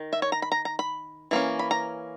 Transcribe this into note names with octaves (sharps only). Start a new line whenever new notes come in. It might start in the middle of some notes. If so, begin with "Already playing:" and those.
Already playing: D#3
E5
C#5
A#5
B5
A#5
A#5
B5
E3 A#3 C#4
B5
A#5